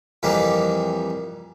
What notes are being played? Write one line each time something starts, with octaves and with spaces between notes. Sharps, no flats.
F2 E3 G3 A#3